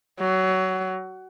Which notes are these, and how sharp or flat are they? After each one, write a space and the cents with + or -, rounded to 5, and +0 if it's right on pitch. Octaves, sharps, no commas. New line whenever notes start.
F#3 +20